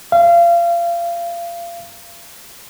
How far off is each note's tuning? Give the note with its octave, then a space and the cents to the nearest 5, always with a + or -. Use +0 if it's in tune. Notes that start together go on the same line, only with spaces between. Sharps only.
F5 -30